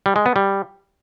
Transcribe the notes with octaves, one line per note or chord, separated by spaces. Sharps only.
G3
G#3
B3
G3